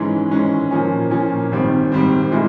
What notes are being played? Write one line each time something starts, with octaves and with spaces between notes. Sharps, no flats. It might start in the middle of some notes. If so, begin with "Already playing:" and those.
Already playing: G#2 E3 G#3 C#4
G#2 E3 G#3 C#4
A#2 F3 A#3 C#4
A#2 F3 A#3 C#4
G#1 G#2 G3 C4
G#1 G#2 G3 C4
A#2 G#3 E4